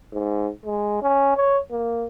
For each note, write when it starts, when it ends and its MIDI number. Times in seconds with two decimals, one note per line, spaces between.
0.13 0.50 44
0.65 1.01 56
1.02 1.33 61
1.36 1.59 73
1.71 2.07 58